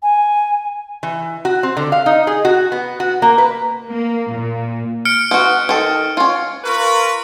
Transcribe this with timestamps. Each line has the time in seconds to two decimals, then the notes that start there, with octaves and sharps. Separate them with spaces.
0.03 G#5
1.03 E3
1.45 F#4
1.63 C4
1.77 D3
1.92 F5
2.06 D#4
2.27 G#4
2.45 F#4
2.72 B3
3.00 F#4
3.22 A#3
3.38 B4
3.89 A#3
4.33 A#2
5.05 F6 C#7 D7
5.31 B3 F#4
5.69 D#3 A4
6.17 C#4 F4
6.64 F4 A#4 B4 C#6